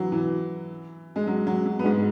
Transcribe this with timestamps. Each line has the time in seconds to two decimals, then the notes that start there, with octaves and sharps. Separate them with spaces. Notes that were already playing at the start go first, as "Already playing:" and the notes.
Already playing: E3 F#3
0.12 E3
1.16 G#3
1.27 F#3
1.47 F#3
1.66 F#3
1.79 B3
1.84 G#2 G#3